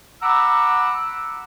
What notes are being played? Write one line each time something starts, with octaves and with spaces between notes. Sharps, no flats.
F#5 A#5 B5 D6 E6